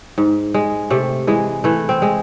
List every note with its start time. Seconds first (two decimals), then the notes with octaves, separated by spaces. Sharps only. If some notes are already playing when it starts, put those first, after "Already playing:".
0.18 G#2
0.54 G#3
0.90 C3 A3
1.27 E3 G#3
1.64 E3 A3
1.89 C4
2.02 G#3